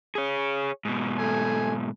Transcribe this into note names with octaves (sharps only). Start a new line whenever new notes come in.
G#4 C#5
G#2 B2
A3 G#5